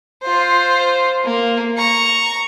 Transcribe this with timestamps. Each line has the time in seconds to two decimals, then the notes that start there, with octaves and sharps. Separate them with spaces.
0.22 F4 C5
1.24 A#3
1.77 A#5 C#6